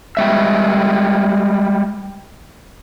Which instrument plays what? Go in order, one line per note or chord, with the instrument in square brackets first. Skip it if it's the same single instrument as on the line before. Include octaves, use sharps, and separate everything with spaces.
[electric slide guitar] G3 G#3 E5